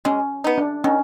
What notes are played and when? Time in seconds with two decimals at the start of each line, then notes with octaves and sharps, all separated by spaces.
0.05 G#3 C#4
0.44 B3 D#4
0.58 D4
0.84 D#3 C#4